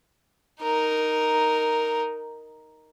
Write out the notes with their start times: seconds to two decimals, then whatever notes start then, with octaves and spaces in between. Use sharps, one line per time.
0.62 D#4 A#4